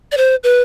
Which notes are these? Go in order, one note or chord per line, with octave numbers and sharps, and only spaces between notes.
D5
C5
B4